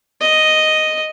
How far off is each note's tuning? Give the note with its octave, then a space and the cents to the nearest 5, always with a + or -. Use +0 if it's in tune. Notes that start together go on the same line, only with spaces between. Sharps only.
D#5 +0